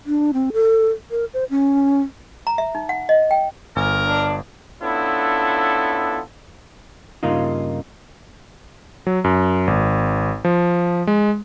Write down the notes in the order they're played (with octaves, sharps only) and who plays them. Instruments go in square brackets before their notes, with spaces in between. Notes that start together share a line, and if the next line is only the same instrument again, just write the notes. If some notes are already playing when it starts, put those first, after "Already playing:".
[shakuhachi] D4
C4
A4
A#4
C5
C#4
[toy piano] A#5
E5
D#4
F#5
D#5
G5
[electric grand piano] G1 G#5 [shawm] A#4
[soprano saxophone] D4
[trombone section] B3 C#4 D4 E4 F4 A4
[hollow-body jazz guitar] G2 C#3 A#3 D#4 F4
[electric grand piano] F#3
F#2
G#1
F3
G#3